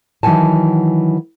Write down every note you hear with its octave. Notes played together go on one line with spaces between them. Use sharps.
D#3 E3 F#3 F#5 G#5 A5